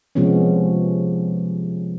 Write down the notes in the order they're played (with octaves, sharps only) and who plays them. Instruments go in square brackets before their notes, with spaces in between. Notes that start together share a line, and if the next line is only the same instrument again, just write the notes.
[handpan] C3 F3 G#3 B3 C#4